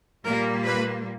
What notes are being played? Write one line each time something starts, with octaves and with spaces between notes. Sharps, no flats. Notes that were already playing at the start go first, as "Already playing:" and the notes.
A#2 G3 A#3 A#4
B4